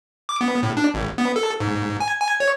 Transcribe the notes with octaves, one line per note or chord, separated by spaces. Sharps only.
D6
B3
A2
D4
G#1
B3
A4
G#2
G#5
G#5
C#5